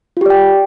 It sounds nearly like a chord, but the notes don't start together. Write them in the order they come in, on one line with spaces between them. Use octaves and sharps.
F4 G4 D5 G5